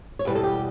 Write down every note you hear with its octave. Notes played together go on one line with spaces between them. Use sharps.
C#5
E2 B2 G3 B4
A4
G4